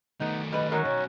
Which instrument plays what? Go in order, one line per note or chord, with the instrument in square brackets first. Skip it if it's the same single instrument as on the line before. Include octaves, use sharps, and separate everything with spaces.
[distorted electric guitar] D#3 A3 [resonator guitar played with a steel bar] B3 D#4
[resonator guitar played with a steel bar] G3 B4 [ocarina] D#5
[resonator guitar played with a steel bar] F#3 G#3 D#4 [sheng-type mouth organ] C#4 F#4 [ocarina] A#4
[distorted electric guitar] B1 [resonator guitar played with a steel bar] D#3 [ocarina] C#5